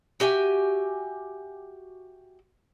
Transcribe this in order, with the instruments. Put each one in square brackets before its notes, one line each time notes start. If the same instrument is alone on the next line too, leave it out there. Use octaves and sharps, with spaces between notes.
[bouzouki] F#4 G4 E5 G#5